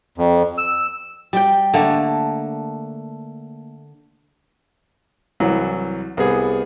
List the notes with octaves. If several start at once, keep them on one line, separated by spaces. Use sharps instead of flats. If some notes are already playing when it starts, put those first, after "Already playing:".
F2
E6
G3 G5
D3 A3 A#3
C2 E3 F#3
C2 G3 B3 G#4